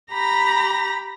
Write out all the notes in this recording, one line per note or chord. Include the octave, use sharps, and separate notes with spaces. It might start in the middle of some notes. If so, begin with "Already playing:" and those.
G4 A#5 B5 A#6